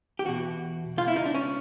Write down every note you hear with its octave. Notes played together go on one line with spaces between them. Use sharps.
G4
E2 B2 F#4
C#2 B2 F4
E4
D#4
D4
C#4